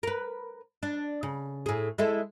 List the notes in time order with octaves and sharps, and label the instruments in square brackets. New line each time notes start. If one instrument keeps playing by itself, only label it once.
[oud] A#4 B4
D4
C#3
A2 G#4
G#3 E4 A4